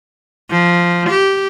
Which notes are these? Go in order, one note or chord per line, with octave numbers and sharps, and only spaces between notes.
F3
G4